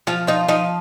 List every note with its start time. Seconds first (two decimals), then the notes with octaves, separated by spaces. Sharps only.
0.07 F3 F4 F5
0.27 D#4 F4 D#5
0.48 F3 D#4 D#5